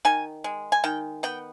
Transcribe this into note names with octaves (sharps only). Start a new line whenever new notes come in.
D#3 G#5
G#3
G#5
D#3 G5
B3 G5